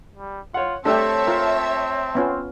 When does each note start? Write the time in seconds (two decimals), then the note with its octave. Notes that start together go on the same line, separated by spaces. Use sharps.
0.16 G3
0.54 F4 C#5 F#5
0.85 A3 C4 D4 G4 C#5 E5 A5 E6
1.27 F4 A#4
2.15 B3 C#4 F4